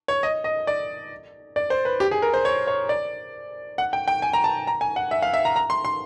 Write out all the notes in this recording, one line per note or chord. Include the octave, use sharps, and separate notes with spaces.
C#5
D#5
D#5
D5
D5
C5
B4
G4
G#4
A#4
C5
C#5
C#5
D5
F#5
G5
G5
G#5
A#5
A5
A#5
G#5
F#5
E5
F5
E5
A#5
A#5
C6
C6